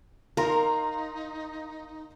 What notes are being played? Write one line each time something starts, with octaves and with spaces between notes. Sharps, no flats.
D#4 A#4 F5 A#5 C6